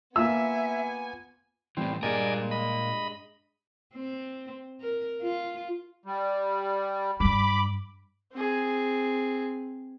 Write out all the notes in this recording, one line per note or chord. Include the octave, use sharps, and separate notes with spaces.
A#3 B3 F4 E5 G#5 E6
A2 E3 G3 C4
G2 A#2 G3 G#3 A#4 D5 D#5 G#5
D#5 B5
C4
A#4
F4
G3
G2 G3 B5 D6
C4 G#4